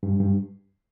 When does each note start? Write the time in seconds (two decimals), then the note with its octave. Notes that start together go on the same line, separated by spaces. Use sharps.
0.03 G2
0.20 G2